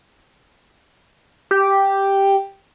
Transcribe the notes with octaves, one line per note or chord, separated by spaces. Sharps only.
G4